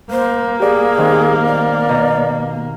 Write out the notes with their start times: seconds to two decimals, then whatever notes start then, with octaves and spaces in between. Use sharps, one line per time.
0.11 A#3 C5
0.60 G4 G#4 D5
0.97 D#3 C4 F#6
1.45 D5
1.89 B2 A#5